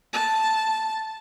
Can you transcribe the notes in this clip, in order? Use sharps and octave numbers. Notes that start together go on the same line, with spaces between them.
A5